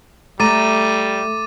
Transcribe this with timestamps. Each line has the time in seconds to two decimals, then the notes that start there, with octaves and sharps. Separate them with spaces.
0.40 G3 A3 A#5 D6 A6 D#7